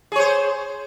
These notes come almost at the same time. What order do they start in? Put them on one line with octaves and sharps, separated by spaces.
G#4 C#5 C5